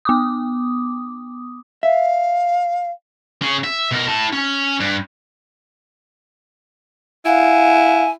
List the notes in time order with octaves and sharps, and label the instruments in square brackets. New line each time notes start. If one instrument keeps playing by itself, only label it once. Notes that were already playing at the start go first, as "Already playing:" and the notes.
[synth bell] B3 D6 D#6
[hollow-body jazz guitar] E5 [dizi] F5
[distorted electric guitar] C#4 G#4
E5
B2 A#4
E4 A5
C#4
G2
[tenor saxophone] E4 [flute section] F5 F#5 [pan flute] G#5